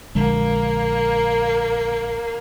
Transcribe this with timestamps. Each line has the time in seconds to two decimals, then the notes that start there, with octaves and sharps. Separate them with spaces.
0.15 A#1 D3 G#3 A#3